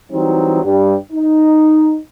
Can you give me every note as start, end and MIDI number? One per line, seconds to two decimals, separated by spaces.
0.12 0.61 52
0.12 0.61 54
0.12 0.61 55
0.12 0.61 60
0.12 0.61 63
0.63 0.94 43
0.63 0.94 55
1.12 1.98 63